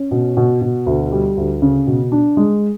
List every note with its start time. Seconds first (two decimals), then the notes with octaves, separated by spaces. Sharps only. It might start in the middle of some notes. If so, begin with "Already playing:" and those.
Already playing: C#4
0.11 B2
0.37 B2
0.62 B2
0.86 D2
1.12 G3
1.37 D2
1.62 C#3
1.87 B2
2.12 D4
2.37 G#3